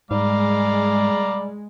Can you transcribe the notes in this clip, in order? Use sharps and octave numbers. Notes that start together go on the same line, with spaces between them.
G#2 G3 G#3 F5 A#5 D6